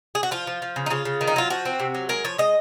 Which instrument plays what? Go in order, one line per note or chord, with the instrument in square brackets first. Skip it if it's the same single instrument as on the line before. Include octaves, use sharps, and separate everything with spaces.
[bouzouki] G#4
F#4
F3 F4
F3
F3
C#3
D#4
C#3 F4
C#3
D#3
D#4
F#3 F4
F3 F#4
C4
C3
F#3
G#3 A#4
F3 C#5
G#3 D#5